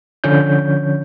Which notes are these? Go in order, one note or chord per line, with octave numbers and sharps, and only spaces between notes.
D3 F3 C#4 C#5 G6